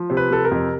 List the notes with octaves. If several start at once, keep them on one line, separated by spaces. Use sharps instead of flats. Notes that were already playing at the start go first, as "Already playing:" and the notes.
Already playing: F3
C3 C5
B4
C3 A4
A#4
F2